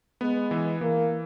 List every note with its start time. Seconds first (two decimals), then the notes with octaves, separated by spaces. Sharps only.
0.21 G#3 B3
0.51 E3
0.81 E3 A#3